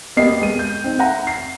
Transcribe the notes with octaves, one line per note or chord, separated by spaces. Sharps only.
A#3 B3 G4 D#5 C7
G#3 D#7
G6
C4 D#4
E5 F#5 A#5
C7